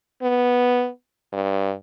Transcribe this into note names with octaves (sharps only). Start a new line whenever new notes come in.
B3
G2